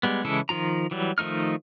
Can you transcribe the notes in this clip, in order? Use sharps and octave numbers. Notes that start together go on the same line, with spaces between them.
G3 G#3 B3
C#3 E3 G#3 E4 A4
D#3 F3 F4 A#5
E3 F#3 G3
D#3 F3 A3 D#4 F6